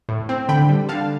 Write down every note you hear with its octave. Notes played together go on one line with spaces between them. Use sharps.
A2
C4
D3 G5 B5
G3
D3 F5 A5